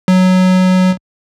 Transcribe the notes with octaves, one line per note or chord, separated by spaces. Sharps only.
F#3